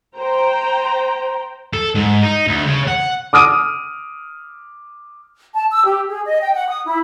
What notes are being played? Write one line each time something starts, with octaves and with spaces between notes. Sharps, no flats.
C5 G5 A#5
A4
G#2
D#4
D2
C#3
F#5
D6 D#6 F6 D7 D#7
A5
E6
G4
G#4
D#5
G5
F#5
D#6
E4